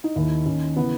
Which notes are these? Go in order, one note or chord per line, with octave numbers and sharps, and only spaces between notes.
D#4
D#2 D#3 E4
D#2 D#3 C#4
C#3 E3 B3